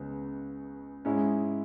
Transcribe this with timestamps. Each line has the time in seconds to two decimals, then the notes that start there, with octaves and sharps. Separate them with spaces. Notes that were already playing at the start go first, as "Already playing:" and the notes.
Already playing: C#2 C#3 G#3 B3
1.05 G#2 G#3 C#4 E4